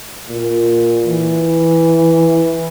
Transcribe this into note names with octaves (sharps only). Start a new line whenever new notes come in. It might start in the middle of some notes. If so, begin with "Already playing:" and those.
A#2
E3